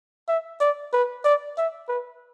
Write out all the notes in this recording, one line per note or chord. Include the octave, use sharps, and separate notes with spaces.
E5
D5
B4
D5
E5
B4